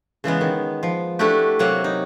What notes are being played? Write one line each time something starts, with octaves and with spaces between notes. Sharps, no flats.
C#3 E3 G#3 B3
D#3
F3
A3 D4 E4 F#4 G4
C3 F#3 A#3 C#5 F#5
D#4